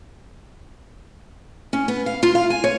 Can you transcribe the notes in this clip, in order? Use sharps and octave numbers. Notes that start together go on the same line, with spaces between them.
C#4
B3
F5
F4
F5
G#5
C#5